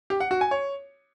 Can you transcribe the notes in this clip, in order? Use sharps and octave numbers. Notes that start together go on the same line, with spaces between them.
G4
F#5
F#4
G#5
C#5